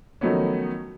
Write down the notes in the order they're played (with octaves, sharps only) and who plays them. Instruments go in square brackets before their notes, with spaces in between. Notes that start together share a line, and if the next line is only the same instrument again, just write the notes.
[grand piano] D#3 F3 F#3 A3 B3 C#4